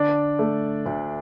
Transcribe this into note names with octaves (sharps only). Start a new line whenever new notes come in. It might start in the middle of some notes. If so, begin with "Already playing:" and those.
Already playing: D3 D4 D5
A3
D2